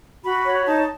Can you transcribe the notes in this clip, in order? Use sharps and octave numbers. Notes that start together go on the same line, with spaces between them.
F#4 B5
C#5
D#4 A5